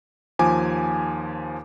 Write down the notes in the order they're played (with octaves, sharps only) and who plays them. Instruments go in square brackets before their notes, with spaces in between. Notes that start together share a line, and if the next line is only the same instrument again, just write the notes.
[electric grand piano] D#2 F3 G#5 D6